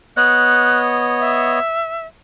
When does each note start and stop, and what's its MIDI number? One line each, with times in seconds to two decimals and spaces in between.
0.17 1.59 59
0.17 1.59 73
0.17 1.59 75
0.17 0.80 90
1.20 2.07 76